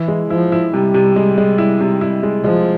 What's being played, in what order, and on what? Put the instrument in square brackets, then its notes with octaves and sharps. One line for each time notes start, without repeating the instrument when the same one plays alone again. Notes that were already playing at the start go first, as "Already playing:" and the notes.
Already playing: [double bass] E3 [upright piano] E4
[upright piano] G#3
[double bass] F3 [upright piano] E4
[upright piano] E4
[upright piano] C3 [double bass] G3
[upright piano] C3
G#3
G#3
E4
C3
E4
G#3
[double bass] F3 [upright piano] G#3